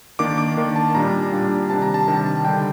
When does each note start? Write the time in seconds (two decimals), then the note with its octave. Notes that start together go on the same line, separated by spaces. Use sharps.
0.19 D#3 A#3 D4 D6
0.38 D6
0.56 D#3 A#3 D4
0.76 A5
0.95 A#2 G3 D4 A#5
1.32 A#2 G3 D4
1.70 C3 D#3 G3 D4 A5
1.82 A#5
1.94 A5
2.08 C3 D#3 G3 D4
2.45 D3 G3 D4 G5